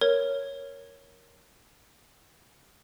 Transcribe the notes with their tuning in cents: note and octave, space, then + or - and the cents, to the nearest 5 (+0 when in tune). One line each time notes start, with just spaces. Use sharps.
A#4 +0 C#5 +0